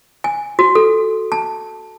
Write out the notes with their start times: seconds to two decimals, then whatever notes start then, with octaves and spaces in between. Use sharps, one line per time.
0.24 G#5
0.59 F#4
0.75 A4
1.32 A5